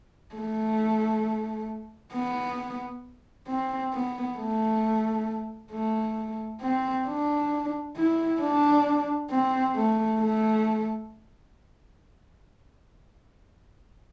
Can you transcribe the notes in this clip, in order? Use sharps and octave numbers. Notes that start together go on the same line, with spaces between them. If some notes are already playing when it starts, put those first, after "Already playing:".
A3
B3
C4
B3
A3
A3
C4
D4
E4
D4
C4
A3
A3